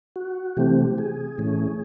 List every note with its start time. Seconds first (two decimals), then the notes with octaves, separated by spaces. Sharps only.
0.16 F#4
0.57 C3 E3 A3 C4 G4
0.98 G#4
1.38 A2 E3 A3 C#4